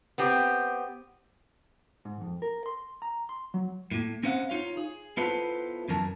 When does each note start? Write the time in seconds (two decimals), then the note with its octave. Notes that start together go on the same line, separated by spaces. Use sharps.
0.18 B3 C4 G4
2.05 G#2
2.21 F2
2.42 A#4
2.66 C6
3.02 A#5
3.29 C6
3.54 F#3
3.91 A2 A#3
4.23 C4 C#4 C5 F5 F#5
4.49 D#4 F4 C#5 F5
4.77 G#4
5.17 B3 E4 F4 A4 B4 C5
5.88 F#2 E3 A#4 A5